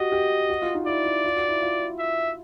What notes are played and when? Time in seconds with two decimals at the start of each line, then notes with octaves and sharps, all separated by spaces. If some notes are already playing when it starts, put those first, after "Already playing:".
Already playing: F#4 G4 D#5
0.12 G4
0.50 F#4
0.62 F4
0.75 D#4
0.87 E4 D5
1.05 F4
1.25 F4
1.36 F#4
1.49 E4
1.62 F4
1.99 E5